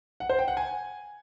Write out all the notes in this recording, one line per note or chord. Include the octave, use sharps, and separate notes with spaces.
F#5
C5
G5
F#5
G#5